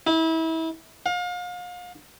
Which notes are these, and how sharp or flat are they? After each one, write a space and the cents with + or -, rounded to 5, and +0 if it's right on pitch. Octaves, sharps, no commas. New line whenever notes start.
E4 -30
F5 +35